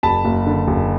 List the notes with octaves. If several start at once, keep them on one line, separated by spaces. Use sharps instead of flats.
F#1 A5 B5
F#1
D3
F#1